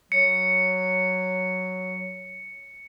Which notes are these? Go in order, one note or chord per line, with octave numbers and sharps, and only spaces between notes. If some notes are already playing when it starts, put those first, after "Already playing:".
F#3 C#7